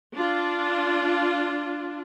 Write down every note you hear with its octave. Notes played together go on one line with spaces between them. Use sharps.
D4 F4